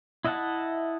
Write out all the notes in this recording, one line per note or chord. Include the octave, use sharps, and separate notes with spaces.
E4 D#5 E5 F#5 A5